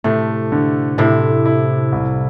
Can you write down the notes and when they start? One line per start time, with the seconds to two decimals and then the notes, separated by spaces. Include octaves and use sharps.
0.04 A2 C3 A3
0.52 D3
0.98 A2 C3 E4
1.46 E4
1.92 C2